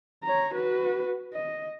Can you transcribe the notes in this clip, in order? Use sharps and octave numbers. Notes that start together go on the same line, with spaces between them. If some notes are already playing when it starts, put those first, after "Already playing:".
C#5 A#5
F#4 B4
D#5